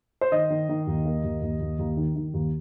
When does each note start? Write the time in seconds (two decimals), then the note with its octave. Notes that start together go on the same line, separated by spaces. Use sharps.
0.21 C5
0.32 D#3 D#5
0.50 D#3
0.69 D#3
0.87 D#2
1.05 A#3
1.24 D#2
1.42 D#2
1.60 D#2
1.79 D#2
1.97 D#3
2.16 D#3
2.34 D#2